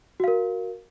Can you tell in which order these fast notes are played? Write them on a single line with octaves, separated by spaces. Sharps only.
F#4 F5 A#4